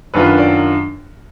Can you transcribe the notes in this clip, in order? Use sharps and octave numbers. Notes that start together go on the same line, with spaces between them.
F#2 D#3 F#3 D4 F4 B4
D5